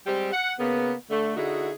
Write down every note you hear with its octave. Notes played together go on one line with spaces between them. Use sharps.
G3 G#3 C4 G4
F#5
C#3 A#3 B3
D3 A3
D3 D#4 E4 F#4 G#4